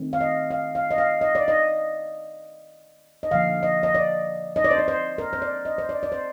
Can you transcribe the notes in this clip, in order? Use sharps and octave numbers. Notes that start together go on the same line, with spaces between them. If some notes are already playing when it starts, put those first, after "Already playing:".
Already playing: D#3 A3 C4
F5
D#5
F5
F5
D#5
F5
D#5
D5
D#5
D#5
D3 F3 A#3 F5
D#5
D#5
D5
D#5
D5
C5
D5
C5
A#4
C5
D5
D#5
C5
D5
D5
C5